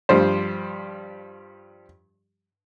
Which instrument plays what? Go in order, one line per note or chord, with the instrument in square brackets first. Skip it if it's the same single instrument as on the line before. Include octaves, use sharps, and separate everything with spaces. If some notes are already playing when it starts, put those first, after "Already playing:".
[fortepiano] G2 F3 G3 C5